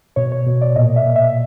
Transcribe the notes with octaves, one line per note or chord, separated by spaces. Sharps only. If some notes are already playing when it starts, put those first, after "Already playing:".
B2 C#5
C#5
B2
D5
A#2 D#5
E5
A#2
E5